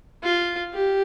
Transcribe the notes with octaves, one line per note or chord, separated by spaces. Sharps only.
F4
G4